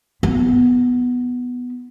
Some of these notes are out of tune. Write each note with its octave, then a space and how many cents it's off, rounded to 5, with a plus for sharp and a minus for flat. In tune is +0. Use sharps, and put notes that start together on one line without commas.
B3 +0 E4 +0